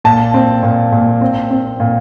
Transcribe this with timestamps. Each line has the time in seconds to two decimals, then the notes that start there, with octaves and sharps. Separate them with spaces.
0.04 A#2 A5
0.34 C4
0.63 A#2
0.92 A#2
1.21 C4
1.50 C4
1.80 A#2